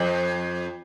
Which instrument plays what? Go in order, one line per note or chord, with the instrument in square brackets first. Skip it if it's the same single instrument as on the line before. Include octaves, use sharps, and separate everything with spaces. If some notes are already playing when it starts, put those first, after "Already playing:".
Already playing: [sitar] F2